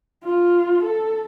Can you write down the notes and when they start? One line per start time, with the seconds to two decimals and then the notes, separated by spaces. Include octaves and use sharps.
0.24 F4
0.84 A4